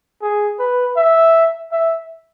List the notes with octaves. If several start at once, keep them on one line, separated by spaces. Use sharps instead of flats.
G#4
B4
E5
E5